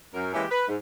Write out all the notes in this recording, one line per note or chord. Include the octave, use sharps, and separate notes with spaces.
F#2 A#4
E3 G#3 A#3 C#4 E4 G4
B4
G#2